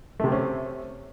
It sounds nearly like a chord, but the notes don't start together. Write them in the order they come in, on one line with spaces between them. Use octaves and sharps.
A3 C3 C4 C#4